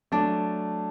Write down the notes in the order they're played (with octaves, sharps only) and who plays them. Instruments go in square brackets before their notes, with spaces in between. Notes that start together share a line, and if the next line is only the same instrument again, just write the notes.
[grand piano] F#3 A3 [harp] D4